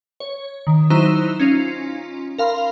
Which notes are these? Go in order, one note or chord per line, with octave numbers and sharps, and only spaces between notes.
C#5
D#3
F#3 D#4 E4 C5 A#5 E6
C#4 D#4 F4
A#4 F5 B5 C6